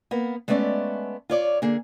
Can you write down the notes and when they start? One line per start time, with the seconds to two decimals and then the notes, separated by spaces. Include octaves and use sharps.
0.11 A#3 B3
0.48 G#3 A3 B3 C#4 D5 E5
1.30 F4 C#5 D5
1.62 D3 A#3 G#4